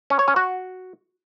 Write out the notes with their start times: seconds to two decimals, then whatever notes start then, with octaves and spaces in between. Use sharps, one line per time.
0.10 C#4
0.19 C#5
0.28 C#4
0.36 F#4